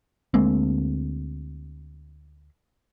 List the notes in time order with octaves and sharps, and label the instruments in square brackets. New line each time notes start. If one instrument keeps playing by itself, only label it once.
[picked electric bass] D2 G#3 A#3 C4